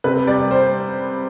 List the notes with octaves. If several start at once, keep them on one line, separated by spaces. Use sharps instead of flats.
C3 B4
G3 D5
G3 C5